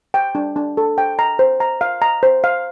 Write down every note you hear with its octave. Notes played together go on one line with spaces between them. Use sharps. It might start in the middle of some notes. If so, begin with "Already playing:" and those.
G5
D4
D4
A4
G5
A#5
C5
A#5
F5
A#5
C5
F5